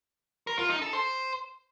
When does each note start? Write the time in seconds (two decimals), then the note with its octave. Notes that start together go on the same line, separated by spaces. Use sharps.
0.47 A#4
0.59 F4
0.70 D#4
0.82 A4
0.93 C5